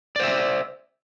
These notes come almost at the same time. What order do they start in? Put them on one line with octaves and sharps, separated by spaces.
D5 C5 E5